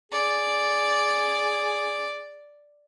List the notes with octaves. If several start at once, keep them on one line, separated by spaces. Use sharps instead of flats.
G#4 D5